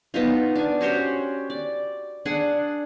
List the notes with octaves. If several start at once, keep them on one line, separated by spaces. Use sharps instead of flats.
B3 D#4 F4
D4 G#5
C#4 F#4 G4 C5
D5
D4 G#4 F#5